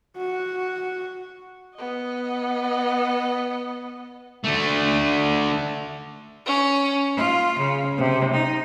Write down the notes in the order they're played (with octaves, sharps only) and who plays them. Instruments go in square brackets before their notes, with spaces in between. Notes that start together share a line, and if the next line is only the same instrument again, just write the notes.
[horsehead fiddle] F#4
[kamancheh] B3 D#5
[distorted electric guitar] D3 A3
[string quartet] C#4
F4
C#3
C3
D#4